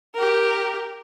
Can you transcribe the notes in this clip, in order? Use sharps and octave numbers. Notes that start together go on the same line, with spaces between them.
G4 A#4